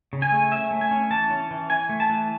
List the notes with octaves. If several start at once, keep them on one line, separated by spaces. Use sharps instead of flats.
C#3
G#5
A3
C#4 E5
A3
G#5
C#4
E3 A5
C#4
E3
E3 G#5
A3
A5
E3